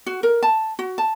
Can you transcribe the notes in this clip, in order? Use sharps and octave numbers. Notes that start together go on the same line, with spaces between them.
F#4
A#4
A5
F#4
A5